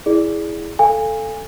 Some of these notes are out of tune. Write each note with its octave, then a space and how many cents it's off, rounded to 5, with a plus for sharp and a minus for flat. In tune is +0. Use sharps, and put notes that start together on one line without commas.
E4 +0 G#4 -5 D5 +0
A4 +0 F5 +0 G#5 -25